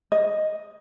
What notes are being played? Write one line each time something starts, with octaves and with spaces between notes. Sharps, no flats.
D#5